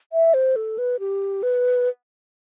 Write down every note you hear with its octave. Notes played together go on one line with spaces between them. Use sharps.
E5
C5
A4
B4
G4
B4